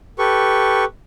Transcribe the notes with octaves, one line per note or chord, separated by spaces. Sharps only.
G4 A4 B4 C#6